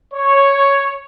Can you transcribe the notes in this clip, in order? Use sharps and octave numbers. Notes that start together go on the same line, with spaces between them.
C#5